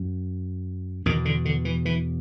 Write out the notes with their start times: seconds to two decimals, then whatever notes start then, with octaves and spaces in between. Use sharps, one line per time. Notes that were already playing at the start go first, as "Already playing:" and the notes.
Already playing: F#2
1.06 E2 B2 D#3
1.25 D3
1.45 D3
1.65 E3
1.85 E3